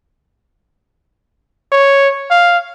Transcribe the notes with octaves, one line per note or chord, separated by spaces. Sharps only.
C#5
F5